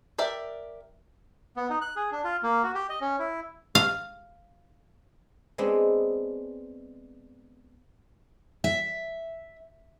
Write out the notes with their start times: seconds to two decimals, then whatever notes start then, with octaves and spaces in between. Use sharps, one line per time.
0.18 G4 A#4 D5 E5
1.57 B3
1.70 D#4
1.81 F#6
1.96 G#4
2.12 D4
2.24 F4
2.43 A#3
2.63 F#4
2.75 G4
2.89 D#5
3.01 C#4
3.19 E4
3.75 F5
5.58 G#3 B3 C4 D4
8.64 E5